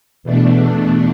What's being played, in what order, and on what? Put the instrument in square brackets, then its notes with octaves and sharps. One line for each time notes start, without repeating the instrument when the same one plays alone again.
[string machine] E2 B2 A3 D4